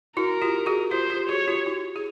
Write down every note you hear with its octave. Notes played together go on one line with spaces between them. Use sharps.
E4 F#4 A#4
F4 G4
F#4 G#4
F4 G4 C5
F4 G4
F#4 G#4 C#5
F4 G4
E4 F#4
G#4